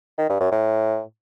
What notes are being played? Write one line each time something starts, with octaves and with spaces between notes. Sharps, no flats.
D#3
G2
F#2
A2